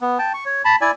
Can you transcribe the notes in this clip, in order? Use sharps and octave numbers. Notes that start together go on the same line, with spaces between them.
B3
G5 A5
C#6
C#5
A5 B5
E4 D5 G#5